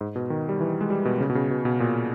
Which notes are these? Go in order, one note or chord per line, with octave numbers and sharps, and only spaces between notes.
G#2
B2
D#3
G3
E3
G#3
G3
B2
C#3
B2
C#3
B2
B2
A#2